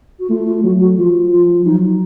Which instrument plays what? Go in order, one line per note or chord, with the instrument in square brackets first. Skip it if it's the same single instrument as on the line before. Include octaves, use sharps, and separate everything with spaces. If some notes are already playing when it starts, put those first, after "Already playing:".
[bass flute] F#4
[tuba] A3 [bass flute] F4
[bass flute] F4
[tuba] F#3 [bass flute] F#4
[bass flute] F#4
[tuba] F3 [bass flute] F4
[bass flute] F4
[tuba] F#3 [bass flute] D#4